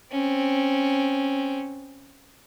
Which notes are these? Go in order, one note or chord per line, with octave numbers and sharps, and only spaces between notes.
C4 C#4